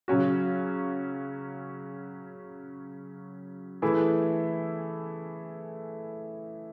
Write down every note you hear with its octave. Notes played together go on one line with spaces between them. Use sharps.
C#3 F#3 C#4 F#4
E3 A3 E4 G#4